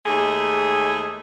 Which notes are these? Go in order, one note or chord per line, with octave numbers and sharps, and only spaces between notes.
D#2 G#3 A3 G#4